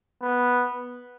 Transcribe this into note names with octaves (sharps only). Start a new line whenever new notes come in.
B3